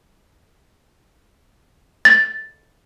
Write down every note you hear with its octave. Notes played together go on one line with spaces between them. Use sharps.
A6